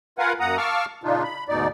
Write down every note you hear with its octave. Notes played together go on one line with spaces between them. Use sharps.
F4 A#4 B4 F5 F#5 G#5
F#2 A#3 F#5 A#5 D#6
F5 A5 C#6 D6 E6 F6
A#2 C#3 D4 D#4 F4
B5
D2 G#2 B2 D#4 D5